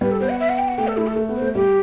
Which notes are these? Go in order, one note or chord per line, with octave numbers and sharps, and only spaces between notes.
G3 B4
A4
B3 C5
F#5
E5
F#5
G5
F#5
A3 G5
A4
A3 E4
A4
A3
B3
C5
A3
G3 G4